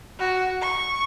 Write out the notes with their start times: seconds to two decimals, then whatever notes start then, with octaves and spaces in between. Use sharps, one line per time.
0.19 F#4
0.62 C#6